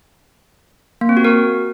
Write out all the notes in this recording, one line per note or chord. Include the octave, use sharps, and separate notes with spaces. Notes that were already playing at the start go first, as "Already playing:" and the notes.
A#3
C4
F#4
A#4